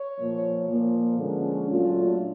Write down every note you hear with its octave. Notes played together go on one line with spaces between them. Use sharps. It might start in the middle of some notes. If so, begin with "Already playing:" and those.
Already playing: C#5
A#2 F3 A#3
A#2 F3 A#3
D3 F3 G#3 C#4
A#2 F#3 A3 D4 F4